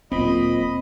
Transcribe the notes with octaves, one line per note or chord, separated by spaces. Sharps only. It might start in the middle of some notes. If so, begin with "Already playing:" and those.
D1 A#2 C4 D#5 B5